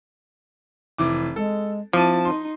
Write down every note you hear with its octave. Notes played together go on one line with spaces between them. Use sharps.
F1 E3 D6
G#3 A4
F3 C4 E4 A5 D6 D#7
D#4 C6